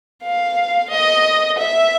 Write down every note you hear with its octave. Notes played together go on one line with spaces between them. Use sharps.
F5
D#5
E5